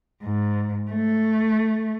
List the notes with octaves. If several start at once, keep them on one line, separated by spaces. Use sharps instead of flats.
G#2
A3